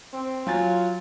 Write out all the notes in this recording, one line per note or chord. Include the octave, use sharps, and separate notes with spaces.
C4
F#3 F4 G#5 A6